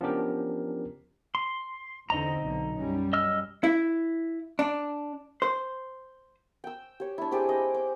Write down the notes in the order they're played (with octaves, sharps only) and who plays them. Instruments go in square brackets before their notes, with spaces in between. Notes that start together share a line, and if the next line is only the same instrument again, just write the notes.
[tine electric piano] F3 B3 C#4 D4 G4 A#4
[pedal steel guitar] C6
[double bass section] E2 D3 C4 [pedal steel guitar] D#4 D#5 A#5
[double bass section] B1 D3
F#2 G3 C#4
[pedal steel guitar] D#5 E6 F6
[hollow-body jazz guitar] E4
D4
C5
[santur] G5 E6
G4 C#5
D4 E4
C4 G4 G#4 D5
D#5
D6